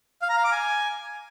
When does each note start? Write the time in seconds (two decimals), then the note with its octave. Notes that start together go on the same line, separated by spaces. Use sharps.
0.22 F5
0.29 A#5
0.37 F5
0.44 D6
0.51 G#5